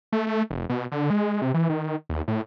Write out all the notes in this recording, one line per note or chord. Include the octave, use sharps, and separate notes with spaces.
A3
A3
F1
B2
D3
G#3
C3
E3
D#3
D#2
A2